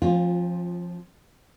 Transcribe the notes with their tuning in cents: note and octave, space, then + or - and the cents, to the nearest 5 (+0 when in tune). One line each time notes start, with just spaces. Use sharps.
F3 +0 C4 +45 F4 +15